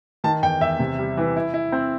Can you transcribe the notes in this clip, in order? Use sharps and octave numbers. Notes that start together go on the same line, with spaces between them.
D#3 A5
E2 G5
E2 E5
C3
G3
E3
E4
E4
C4